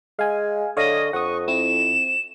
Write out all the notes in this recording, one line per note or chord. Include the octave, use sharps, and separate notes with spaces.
G#3 F5 G#5
D3 C#5 D#5 F5 D#6
F2 F#5 C#6 D#6
C4 E4 E7